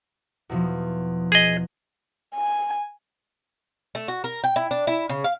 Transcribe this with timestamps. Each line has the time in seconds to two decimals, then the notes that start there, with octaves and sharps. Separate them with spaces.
0.49 E2 B2 F3
1.32 G#4 D#5
2.35 G#5
3.95 A3
4.08 F#4
4.24 A#4
4.44 G5
4.56 E4
4.71 D4
4.87 E4
5.09 C#3
5.24 F5